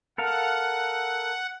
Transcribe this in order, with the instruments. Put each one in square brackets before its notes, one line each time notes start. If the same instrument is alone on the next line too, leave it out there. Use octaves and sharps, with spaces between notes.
[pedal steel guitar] A4 A#4 F5 [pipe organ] F#5